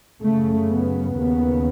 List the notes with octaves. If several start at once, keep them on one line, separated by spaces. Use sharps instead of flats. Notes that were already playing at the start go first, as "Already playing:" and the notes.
F#2 C#3 A3
B3
D#2 C#3 B3